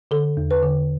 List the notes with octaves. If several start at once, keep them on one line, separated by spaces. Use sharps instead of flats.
D3 A4
E2
B4
D3